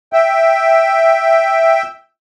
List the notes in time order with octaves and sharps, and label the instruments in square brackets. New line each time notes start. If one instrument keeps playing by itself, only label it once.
[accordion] E5 G5